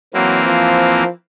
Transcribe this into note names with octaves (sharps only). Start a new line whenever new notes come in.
E3 F#3 A#3 C4
F3